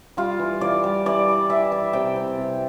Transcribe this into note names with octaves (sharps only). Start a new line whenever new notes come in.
G3 F4
E3
E3 D5
G3
E3 D5
E3
E3 E5
E3
C3 G5
C4
C3